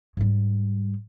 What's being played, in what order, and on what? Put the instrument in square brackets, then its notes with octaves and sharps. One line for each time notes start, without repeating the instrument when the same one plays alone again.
[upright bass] G#2 G3